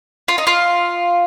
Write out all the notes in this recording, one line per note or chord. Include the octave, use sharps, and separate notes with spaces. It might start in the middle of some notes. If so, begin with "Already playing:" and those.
F4
D#4
F4